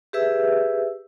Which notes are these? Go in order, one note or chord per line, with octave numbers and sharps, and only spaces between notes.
G4 G#4 B4 E5 E6